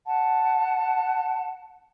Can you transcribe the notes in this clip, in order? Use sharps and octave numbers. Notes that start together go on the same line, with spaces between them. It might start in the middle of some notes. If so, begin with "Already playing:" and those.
F#5 A5